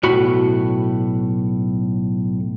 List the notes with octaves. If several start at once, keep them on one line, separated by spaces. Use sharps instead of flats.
B1 A2 F#4 B5